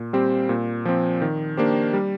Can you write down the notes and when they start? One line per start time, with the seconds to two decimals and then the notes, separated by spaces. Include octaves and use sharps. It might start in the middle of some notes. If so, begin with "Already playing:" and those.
Already playing: A#2
0.13 G3 C4 G4 C5
0.49 A#2
0.85 F3 C4
1.22 D#3
1.57 A#3 D4 G4 C5
1.93 G3